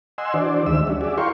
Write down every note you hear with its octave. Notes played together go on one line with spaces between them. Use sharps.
D#5 F#5 G#5 C6 E6
E3 D4 F#4 C5 D5
D2 D#3 G#3 E5 E6
G3 C#4 D4 F#4
F#4 G#4 D5 E5
E4 A#4 F5 G5 C6 C#6